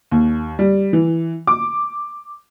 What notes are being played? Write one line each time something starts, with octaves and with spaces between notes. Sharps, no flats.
D#2
G3
E3
D6